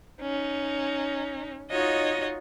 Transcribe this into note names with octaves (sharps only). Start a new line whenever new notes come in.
C#4 D#4
D#4 F4 F#4 C#5 D#5